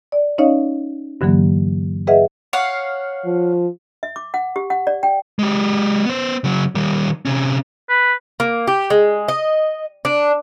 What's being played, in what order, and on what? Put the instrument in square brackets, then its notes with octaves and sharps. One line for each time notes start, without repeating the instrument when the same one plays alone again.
[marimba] D5
C#4 D#4 C#5 D#5 F5
G2 D3 E3 F#3 A#3
G#4 B4 D#5 E5 F#5
[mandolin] C#5 F5 F#5
[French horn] F3
[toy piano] E5
D6
F#5
G4
F#5
D5
G5
[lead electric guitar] G#3 G4
B3 C5
C#3 F#3
D#3 G3
C3 C#4
[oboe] B4
[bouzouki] A#3
G4
G#3
D#5
D4